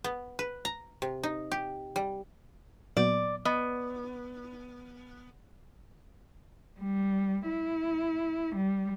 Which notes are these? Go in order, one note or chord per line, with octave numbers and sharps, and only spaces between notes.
B3
B4
A#5
C3
D#4
G4
G3
A#2 F#3 B3 D5
B3 D#5
G3
E4
G3